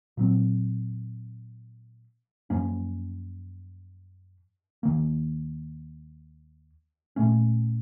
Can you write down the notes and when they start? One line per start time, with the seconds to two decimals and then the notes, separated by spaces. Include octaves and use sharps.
0.17 A#2 F#3 C4
2.50 F#2 F3 A#3 C#4
4.83 D#2 D#3 A#3
7.16 A#2 A3 C#4